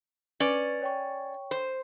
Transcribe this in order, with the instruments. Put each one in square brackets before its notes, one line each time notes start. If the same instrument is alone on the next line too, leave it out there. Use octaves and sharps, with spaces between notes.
[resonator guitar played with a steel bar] C#4 D5 [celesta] B4
[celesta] C#5 G5 C#6
[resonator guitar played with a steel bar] C5